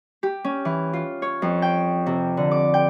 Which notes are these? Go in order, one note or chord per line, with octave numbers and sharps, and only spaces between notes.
G4
C#4
E3
F4
C#5
F2
G5
C3
D3
D6
G5